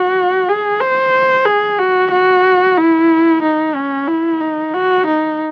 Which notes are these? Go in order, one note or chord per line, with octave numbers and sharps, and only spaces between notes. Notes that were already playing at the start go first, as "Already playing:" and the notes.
Already playing: F#4
G#4
C5
G#4
F#4
F#4
E4
D#4
C#4
E4
D#4
F#4
D#4